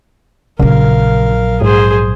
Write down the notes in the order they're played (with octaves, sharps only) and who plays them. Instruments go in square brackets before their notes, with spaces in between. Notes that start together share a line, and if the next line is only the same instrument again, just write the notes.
[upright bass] A#1 F#3 [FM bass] C#3 [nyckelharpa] A#4 F5
[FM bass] G#2 [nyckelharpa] G#4 C5